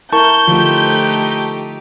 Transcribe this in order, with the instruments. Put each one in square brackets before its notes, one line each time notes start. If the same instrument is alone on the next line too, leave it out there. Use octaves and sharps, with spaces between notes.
[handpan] E4 A#4 [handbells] A5 C#6 [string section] G6
[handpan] D3 F3 F4 [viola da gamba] A3 D#4 G4